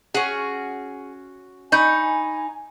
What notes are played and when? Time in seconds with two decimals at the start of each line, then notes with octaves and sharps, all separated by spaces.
0.14 C#4 F#4 G#4
1.72 D#4 G#5 B5 C#6 G6